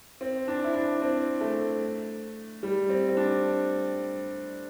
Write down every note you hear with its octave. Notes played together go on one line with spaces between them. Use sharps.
C4
D4
E4
D4
C4
A3
G3
C4
C4
D4